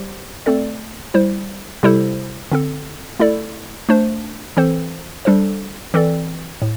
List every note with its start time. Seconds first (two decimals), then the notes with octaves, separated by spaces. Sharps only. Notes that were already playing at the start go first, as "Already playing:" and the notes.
Already playing: G3 G4 C5
0.46 A3 C4 A4 D5
1.14 G3 E4 C5
1.83 C3 G3 E4 A4 C5
2.52 D3 C4 A4
3.20 A3 E4 A4 D5
3.89 A3 D4 C5
4.57 E3 C4 A4 C5
5.25 G3 D4 A4 C5
5.94 E3 C4 A4 D5
6.62 A2